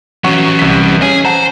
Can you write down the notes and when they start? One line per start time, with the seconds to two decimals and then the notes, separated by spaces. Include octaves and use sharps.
0.24 E3 F#3 C#4 F#5 C#6
0.59 C2 B6
1.02 C#4 G#4 G#5
1.25 C5 F#5 A5 A#5